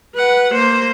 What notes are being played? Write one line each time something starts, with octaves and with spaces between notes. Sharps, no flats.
B4 F#5
A#3 C5